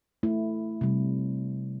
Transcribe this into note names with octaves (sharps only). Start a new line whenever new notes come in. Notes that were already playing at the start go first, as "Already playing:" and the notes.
A3 E4
C3 G3